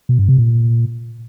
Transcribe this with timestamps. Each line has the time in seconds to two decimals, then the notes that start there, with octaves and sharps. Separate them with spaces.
0.09 B2
0.19 G2
0.29 C3
0.38 A#2